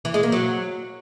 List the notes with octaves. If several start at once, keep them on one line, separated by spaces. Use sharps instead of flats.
E3
G#3
A#3
F#3